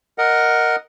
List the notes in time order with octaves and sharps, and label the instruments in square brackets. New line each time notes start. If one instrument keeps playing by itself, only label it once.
[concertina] A#4 D#5 F#5